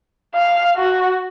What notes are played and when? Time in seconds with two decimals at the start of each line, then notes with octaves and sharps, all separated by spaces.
0.34 F5
0.77 F#4